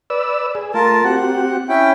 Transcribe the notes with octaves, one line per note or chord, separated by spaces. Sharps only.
B4 D5 E6
G#4
A3 F4 A#4 A5
C4 F#4 G4 F#5
C#4 E4 G5